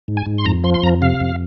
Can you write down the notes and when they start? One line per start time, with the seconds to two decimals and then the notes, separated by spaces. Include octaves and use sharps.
0.08 G#2
0.17 G#5
0.26 G#2
0.38 C6
0.45 F2 A#5
0.64 F3 C6
0.74 C6
0.83 F2 A#5
1.02 C3 F5
1.20 F2